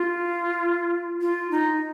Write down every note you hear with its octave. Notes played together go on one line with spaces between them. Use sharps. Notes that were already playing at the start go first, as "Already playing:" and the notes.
Already playing: F4
F4
D#4